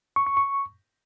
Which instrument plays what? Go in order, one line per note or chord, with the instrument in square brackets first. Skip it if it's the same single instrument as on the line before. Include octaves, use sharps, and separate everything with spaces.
[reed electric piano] C#6
C#6
C#6